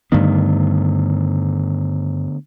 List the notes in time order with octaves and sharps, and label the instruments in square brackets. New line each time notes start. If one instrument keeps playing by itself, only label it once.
[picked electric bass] G2 D#3 [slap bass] D3 A3 B3